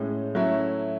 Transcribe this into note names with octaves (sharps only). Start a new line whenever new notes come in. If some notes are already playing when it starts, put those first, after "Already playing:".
Already playing: A2 G#3 C#4
F#3 A3 C#4 E4